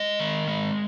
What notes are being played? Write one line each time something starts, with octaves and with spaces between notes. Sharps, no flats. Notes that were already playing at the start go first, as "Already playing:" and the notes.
Already playing: G#3 D#5
D#3
G#3